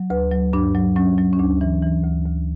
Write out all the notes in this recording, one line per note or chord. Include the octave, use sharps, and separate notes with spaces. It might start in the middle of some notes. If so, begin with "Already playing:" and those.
Already playing: F#3
D2 B4
F#3
G2 D4
F#3
F#3 C#4
F#3
C#4
D2 D4
E3
E3
D2
D2